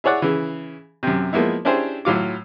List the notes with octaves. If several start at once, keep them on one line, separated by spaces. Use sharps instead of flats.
E4 G#4 C#5 D5 F#5
C#3 E3
F#2 C3
F3 G#3 A#3 B3 E4
C#4 D4 E4 G4 G#4 C5
A2 F#3 F4 D6